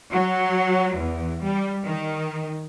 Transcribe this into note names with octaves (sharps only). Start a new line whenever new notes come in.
F#3
E2
G3
D#3